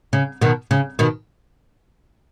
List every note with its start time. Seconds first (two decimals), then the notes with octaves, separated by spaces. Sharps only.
0.13 C#3
0.41 B2 D#3
0.71 C#3
0.99 B2 D#3